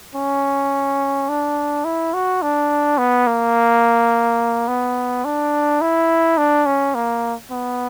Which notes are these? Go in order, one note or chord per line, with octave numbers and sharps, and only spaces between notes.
C#4
D4
E4
F#4
D4
B3
A#3
B3
D4
E4
D4
C#4
A#3
B3